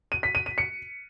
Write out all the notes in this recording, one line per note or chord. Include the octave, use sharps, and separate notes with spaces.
D#7
B6
D#7
D#7
C#7